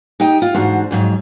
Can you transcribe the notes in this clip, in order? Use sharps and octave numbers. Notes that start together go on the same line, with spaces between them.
D#4 G4 D#5 G5
F4
E2 G#2 D4 F#4 C5
F2 G#2 F#3